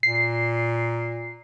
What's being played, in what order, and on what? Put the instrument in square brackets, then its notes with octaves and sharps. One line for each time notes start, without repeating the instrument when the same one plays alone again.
[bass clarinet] A#2 [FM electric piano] C7